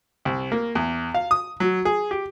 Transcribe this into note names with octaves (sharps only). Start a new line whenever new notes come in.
C2
A#3
E2
F5
D#6
F#3
G#4
G4